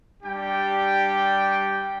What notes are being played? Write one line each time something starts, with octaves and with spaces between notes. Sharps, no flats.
G3 D4 G4 G5